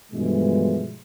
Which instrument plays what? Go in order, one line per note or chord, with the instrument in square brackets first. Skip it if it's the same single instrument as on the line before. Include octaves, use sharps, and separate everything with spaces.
[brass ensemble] G2 B2 D3 E3 F3 G#3